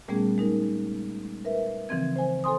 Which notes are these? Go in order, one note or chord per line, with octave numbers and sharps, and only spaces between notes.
A#2 G3 A3 B3 C#4 G#4
G#3 D#4 A#4
A#4 B4 E5
C#3 E3 F3 C4 G#6
C5 G#5
A4 C5 G#5 C6 D#6